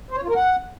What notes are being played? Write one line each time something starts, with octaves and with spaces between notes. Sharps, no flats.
C5
C#5
F4
A#4
F#5